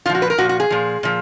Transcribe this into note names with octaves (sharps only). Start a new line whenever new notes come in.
A#2 F3 F4
F#4
B4
A#4
A#2 F3 F#4
F#4
G#4
A#2 F3
A#2 F3